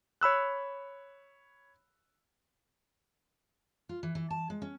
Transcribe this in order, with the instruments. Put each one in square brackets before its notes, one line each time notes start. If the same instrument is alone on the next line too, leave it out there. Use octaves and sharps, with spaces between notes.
[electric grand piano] C#5 B5 E6 F#6
[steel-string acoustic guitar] F4
E3
E3
A5
G#3
C#4